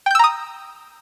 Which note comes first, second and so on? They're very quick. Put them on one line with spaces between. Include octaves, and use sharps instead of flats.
G5 G6 E6 A#5 D#6